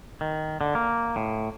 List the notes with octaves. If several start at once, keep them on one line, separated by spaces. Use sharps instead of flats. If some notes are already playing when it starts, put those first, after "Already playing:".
D#3
D3
A#3
A2